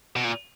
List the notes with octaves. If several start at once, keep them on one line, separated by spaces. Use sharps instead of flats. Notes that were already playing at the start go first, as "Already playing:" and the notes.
B2
A#2